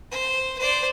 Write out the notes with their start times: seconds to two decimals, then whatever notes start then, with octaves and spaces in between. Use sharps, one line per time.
0.11 C5
0.58 C5 D5